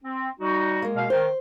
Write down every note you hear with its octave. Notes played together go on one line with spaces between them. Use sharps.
C4
G3 D#4 F#4
G#3 A#3
B2 F5
D#3 C5